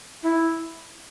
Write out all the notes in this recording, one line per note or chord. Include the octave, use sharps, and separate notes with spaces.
E4